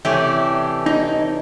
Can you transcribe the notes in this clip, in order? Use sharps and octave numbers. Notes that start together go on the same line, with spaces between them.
C3 E3 A3 C#4 D4 G4
D#4